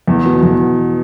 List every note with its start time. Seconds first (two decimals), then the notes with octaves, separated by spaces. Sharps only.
0.08 E2
0.25 B2 B3
0.43 E2